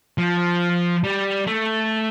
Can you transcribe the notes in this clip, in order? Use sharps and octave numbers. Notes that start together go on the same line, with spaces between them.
F3
G3
A3